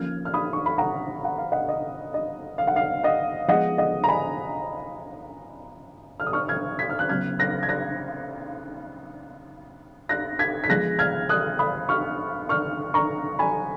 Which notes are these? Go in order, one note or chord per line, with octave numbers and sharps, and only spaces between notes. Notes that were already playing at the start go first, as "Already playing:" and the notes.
Already playing: F3 A#3 C#4 F6 G#6
F6
B5 D#6
C#6
B5
F#5 A#5
F#5
F5
D#5 F#5
D#5
D#5
F5
F#5
F5
D#5 F#5
F3 G#3 B3 D#5 F#5
D#5 F#5
A#5
G#5 B5
F6
D#6
C#6 F6
F6 G#6
G#6 B6
F6
F#6
C#3 F#3 B3 F6 G#6
F#6 A#6
G#6
F#6 A#6
F#6 A#6
G#6 B6
B6
F3 G#3 B3 F#6 A#6
F6 G#6
D#6 F#6
B5 D#6
C#6 F6
C#6 F6
A#5 C#6
G#5 B5